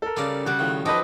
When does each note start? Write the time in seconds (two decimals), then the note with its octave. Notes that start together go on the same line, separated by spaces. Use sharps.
0.02 A4 A#4
0.17 C#3 G3 D#4 D5 F5
0.46 C#3 G3 F#4 G4 F#5
0.59 A2 D#3 F3
0.86 F3 F#3 D#4 G4 A4 B4 D#5